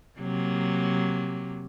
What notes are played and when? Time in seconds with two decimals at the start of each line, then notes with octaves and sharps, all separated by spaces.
0.20 C3 F#3 A#3